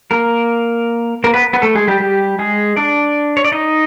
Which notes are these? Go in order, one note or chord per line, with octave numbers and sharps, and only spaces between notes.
A#3 A#4
A#3 A#4
B3 B4
B3 B4
A3 A4
G#3 G#4
G3 G4
G3 G4
G#3 G#4
D4 D5
C#5
D5
D#4 D#5